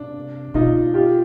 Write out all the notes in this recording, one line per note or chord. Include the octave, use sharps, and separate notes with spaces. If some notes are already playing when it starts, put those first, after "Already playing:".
Already playing: C3 D4
B2 D#4 F4
F4 G4